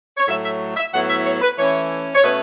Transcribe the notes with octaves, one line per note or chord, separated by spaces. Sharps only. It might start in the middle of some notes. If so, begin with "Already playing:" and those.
C#5
A2 F#3 A3 E5
E5
E5
A2 F#3 B3 E4 F#5
E5
C#5
B4
E3 A3 C#4 E4 C#5
C#5
B2 A3 C#4 B4